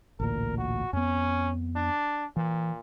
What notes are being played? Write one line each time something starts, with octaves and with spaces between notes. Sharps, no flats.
A1 D2 A#2 A#4
F#4
F2 B3 C#4
D4
A#2 E3